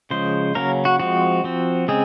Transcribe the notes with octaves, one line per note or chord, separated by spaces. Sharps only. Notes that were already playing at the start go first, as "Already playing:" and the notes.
C#3 F3 G#3 C5
C#3 F#3 A#3 C#4 A#4
F#4
F3 G#3 C4 F#4
F3 C4
C#3 G#3 C4 G#4